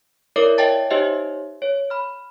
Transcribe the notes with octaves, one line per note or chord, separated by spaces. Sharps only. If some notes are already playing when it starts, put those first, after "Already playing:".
E4 A#4 C#5 D5 E5 D6
C#5 D#5 E5 G5 A5 A6
D#4 G4 C5 C#5 D#5 E5
C#5
B5 F6